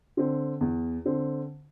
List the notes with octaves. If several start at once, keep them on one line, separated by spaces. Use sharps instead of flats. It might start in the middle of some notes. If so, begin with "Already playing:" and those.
D3 C4
E2
D3 C4